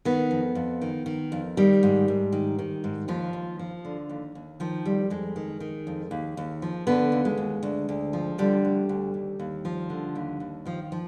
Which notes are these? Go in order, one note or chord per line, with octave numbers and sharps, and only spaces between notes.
D#3 B3
F2
F2
D#3
D#3
F2
D#3 G3
G#2
G#2
D#3
D#3
G#2
D#2 F3
D#2
F3
D3
D#2
D#2
D#3 F3
F2 G3
F2 G#3
D#3
D#3
F2
D#2
D#2
F3
D3 B3
D#2
G#3
D#2
D2
D2
F3
D3 G3
D2
D2
D#2
D#2
F3
D3
D#2
D#2
D#3 F3
F3